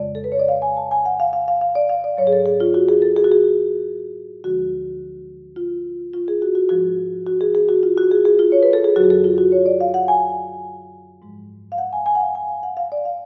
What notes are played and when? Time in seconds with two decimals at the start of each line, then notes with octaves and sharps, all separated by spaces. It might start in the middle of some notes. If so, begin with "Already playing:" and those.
Already playing: F2 C#3 G#3 D5
0.15 A4
0.24 B4
0.32 C#5
0.40 D5
0.49 F5
0.62 G#5
0.77 A5
0.91 G#5
1.06 F#5
1.20 F5
1.33 F5
1.48 F5
1.61 F5
1.75 D5
1.89 F5
2.04 D5
2.17 G#2 F#3 C#5
2.27 G#4
2.33 A4
2.46 G#4
2.60 F4
2.74 F#4
2.89 G#4
3.02 A4
3.17 G#4
3.24 F#4
3.32 G#4
4.44 D2 D3 F3 G#3 F#4
5.56 F4
6.13 F4
6.28 G#4
6.42 F#4
6.55 F#4
6.69 G#2 F3 G#3 F#4
7.27 F#4
7.41 G#4
7.55 G#4
7.69 F#4
7.83 F4
7.98 F#4
8.11 G#4
8.25 G#4
8.39 F4
8.52 C#5
8.63 B4
8.73 A4
8.84 G#4
8.96 F#2 D3 F#3 F#4
9.04 G#4
9.10 A4
9.24 F4
9.38 F#4
9.52 C#5
9.66 D5
9.80 F5
9.94 F#5
10.08 G#5
11.22 G#2 F3 G#3
11.72 F5
11.78 F#5
11.93 G#5
12.06 G#5
12.15 F#5
12.21 F5
12.35 G#5
12.48 F5
12.63 F#5
12.77 F5
12.92 D5
13.05 F5